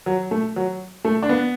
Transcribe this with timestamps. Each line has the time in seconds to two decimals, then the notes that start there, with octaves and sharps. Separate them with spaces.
0.06 F#3
0.31 A3
0.56 F#3
1.05 A3
1.23 D4
1.29 B3